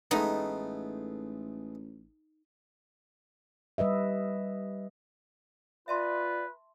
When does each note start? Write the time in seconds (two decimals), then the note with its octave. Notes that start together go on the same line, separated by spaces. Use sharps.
0.11 A1 G#3 A3 B3 D#4
3.78 G3 B4 D#5 E5
5.88 F4 B4 D5 E5 A5 C6